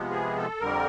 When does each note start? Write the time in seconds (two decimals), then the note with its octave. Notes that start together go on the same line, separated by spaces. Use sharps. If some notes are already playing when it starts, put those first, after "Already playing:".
Already playing: C3 F3 G#3 B3
0.11 G#4
0.37 A4
0.60 F2 D3 G3 A#4